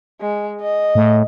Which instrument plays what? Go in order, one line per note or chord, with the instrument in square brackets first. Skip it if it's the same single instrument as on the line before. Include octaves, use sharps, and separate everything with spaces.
[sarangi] G#3
D#5
[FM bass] A2